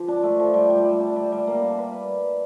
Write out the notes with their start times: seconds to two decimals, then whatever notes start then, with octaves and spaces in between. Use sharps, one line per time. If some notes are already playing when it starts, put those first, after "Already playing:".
Already playing: F3 G4
0.08 D4
0.23 A3
0.40 F3
0.54 G3
0.70 G3
0.85 G3
1.00 D4
1.16 G3
1.32 G3
1.47 A#3
1.62 D4
1.78 B4